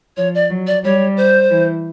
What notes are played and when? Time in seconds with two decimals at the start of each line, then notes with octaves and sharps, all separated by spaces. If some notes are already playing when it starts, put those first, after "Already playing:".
0.17 F3 C#5
0.35 D5
0.50 F#3
0.67 D5
0.84 G3 C#5
1.17 C5
1.51 E3